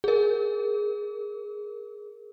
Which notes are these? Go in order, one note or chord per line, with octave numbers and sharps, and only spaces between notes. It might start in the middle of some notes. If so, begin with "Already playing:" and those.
G#4 A#4